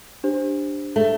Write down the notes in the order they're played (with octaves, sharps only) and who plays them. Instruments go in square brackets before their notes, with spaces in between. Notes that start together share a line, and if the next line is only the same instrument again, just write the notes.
[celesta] D4 G4 C5
[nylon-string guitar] A3